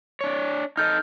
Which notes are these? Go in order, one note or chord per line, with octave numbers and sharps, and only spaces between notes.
D4 C#5
D#4 A4 D#5 F6 G6